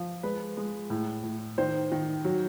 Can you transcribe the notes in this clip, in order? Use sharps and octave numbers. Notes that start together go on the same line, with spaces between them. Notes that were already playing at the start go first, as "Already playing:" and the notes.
Already playing: F3
G#3 B4
G#3
A2
A2
D#3 C5
D#3
F#3